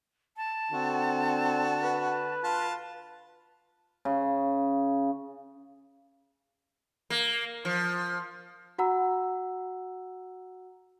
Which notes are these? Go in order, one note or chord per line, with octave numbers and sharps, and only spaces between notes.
A5
D3 C4 F#4
B4
F4 A5
C#3
A#3
F3
F#4 F#5 A#5 E6